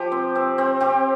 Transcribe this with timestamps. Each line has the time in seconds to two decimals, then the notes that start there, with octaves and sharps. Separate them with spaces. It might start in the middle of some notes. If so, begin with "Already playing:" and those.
Already playing: F3 G4
0.12 C4
0.35 C4
0.58 C4
0.81 C4 G4